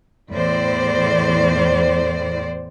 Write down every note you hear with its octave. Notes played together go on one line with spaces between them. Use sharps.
E2 A2 C5 D5